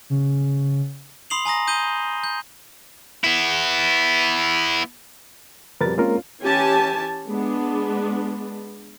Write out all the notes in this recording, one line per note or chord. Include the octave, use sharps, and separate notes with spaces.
C#3
B5 C6 D#6 C7 F7 F#7
G#5 A#5 D#6 A#6
D#6 G6 D#7 G7
G6
B3 E4
F2 B2 G3 A#4 B4 A6
G#3 A#3 C4 C#4 F4 A#4
E3 C#4 G4 G#5 A5
G#3 B3 D4